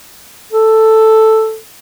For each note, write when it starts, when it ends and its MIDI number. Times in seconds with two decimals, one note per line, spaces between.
0.52 1.57 69